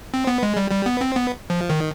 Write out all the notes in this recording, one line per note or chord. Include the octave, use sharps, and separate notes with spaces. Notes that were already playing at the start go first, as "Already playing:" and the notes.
C4
B3
G#3
G3
G3
B3
C4
B3
F3
D#3